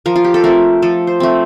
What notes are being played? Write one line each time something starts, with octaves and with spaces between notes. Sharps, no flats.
F3 A#4
F4
G4
A4
A3 C4 A#4
F3 A4
C5
A3 C4